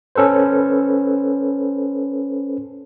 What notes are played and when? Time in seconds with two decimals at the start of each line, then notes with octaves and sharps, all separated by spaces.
0.15 C#4 A4 B4 C5